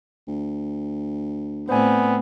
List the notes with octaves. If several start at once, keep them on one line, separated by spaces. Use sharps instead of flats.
D2
A2 B3 C4 C5 D5 G#5